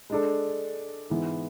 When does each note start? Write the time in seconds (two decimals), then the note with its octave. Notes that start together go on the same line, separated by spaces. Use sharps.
0.10 G#3 D4 A4
1.10 G#2 E3 B3